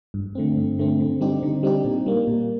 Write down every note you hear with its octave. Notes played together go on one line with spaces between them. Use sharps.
G2
D3 A3 C4
G2
D3 A3 C4
D3
G3 C4 D#4 G4
D3
G3 C4 D#4 G4
A#2
G3 A#3
A#2